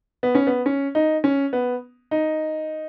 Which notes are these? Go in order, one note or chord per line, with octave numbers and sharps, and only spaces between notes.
B3
C#4
B3
C#4
D#4
C#4
B3
D#4